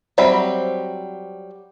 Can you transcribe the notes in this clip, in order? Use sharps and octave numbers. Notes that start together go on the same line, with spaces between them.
F#3 G3 C4 E5 B5